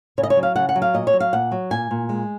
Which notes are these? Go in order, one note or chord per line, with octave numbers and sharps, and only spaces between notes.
C#3 C#5
D#5
C#5
F#3
F5
C#3 F#5
F#5
F#3
F5
A#2 D#5
C#5
F#3
F5
A#2 F#5
F#3
A#2 G#5
A#2
G#3